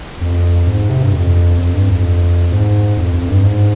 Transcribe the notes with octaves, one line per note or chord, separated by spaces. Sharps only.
F2
G#2
C3
G2
F2
F2
G2
F2
G#2
F2
F2
G2
G#2